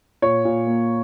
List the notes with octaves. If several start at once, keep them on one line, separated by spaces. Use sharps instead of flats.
A#2 C#5
A#2
A#3